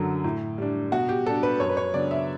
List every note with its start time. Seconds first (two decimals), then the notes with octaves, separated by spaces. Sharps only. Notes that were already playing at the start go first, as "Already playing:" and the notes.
Already playing: F#2 D3 F#3
0.24 A2
0.58 G3 D4
0.92 B2 F#4
1.09 G4
1.26 G3 D4 A4
1.43 B4
1.60 F#2 C#5
1.69 B4
1.77 C#5
1.94 C#3 F#3 B3 D4 D5
2.11 E5